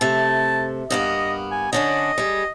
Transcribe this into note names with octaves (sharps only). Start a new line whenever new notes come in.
C3 A3 A5
G2 A#3 B3 D#5
G#5
D3 C#4 D4 D#5
G3 G#4